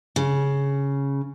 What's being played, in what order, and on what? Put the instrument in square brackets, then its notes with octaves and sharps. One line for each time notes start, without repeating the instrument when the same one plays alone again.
[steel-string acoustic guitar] C#3